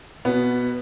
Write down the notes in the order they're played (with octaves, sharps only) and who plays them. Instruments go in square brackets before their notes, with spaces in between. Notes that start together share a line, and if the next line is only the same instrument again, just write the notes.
[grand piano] B2 B3